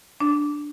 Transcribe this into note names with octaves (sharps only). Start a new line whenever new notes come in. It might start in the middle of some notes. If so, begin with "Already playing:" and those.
D4